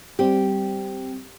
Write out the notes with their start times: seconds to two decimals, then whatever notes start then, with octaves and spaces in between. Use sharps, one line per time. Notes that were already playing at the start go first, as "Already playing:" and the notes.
0.19 G3 C4 G4